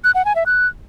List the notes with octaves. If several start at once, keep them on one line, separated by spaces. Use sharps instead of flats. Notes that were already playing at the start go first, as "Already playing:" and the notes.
F#6
F#5
G#5
E5
F#6